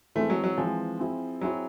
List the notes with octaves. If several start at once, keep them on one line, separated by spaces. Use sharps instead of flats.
E3 G#3 A3 C4
F#3
F#3
E3 F3 G#3 C4
C4 E4 G#4
F#3 C4 E4 G#4